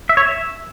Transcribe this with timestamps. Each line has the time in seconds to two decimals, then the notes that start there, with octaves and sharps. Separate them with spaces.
0.09 E5
0.17 C#5
0.25 E5